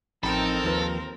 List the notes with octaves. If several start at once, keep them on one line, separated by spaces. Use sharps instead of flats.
A1 F2 C4 D#4 A4 A#4 G5 B5
D#2 D#3 F3 B4